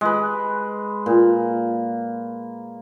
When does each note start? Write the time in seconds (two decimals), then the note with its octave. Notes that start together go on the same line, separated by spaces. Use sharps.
0.01 G#3 B4
1.06 A#2